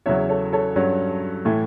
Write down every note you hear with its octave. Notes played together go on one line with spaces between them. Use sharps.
E2 C#3 F#3 C#5 E5
A4 C#5
A4 C#5
G2 F#3 C#4
A2 E3 A3